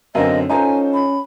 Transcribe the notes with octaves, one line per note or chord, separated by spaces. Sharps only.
F#2 D3 C4 A#4 D#5 F5 G#5
C#4 D#4 F4 A4 C5 G#5 A#5
B5